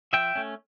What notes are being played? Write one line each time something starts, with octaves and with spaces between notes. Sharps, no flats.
F3 E5 G5
A3 C#4